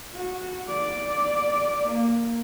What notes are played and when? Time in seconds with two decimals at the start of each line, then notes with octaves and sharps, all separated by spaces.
0.15 F#4
0.68 D5
1.86 A#3